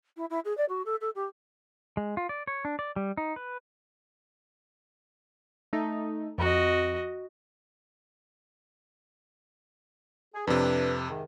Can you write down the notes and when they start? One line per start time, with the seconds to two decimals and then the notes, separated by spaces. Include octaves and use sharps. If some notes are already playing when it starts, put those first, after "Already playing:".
0.17 E4
0.30 E4
0.45 G#4
0.57 D5
0.69 F#4
0.86 A4
1.01 A4
1.15 G4
1.97 G#3
2.17 F4
2.29 D5
2.47 C#5
2.65 D4
2.79 D5
2.96 G3
3.17 D#4
3.36 B4
5.73 A3 D#4
6.38 F2 F#4 D#5
10.34 G#4
10.47 F2 C3 D4 B4
11.09 G#2 C3 D#3